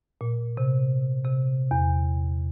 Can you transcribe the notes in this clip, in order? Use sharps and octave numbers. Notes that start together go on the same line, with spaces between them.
A#2
C3
C3
E2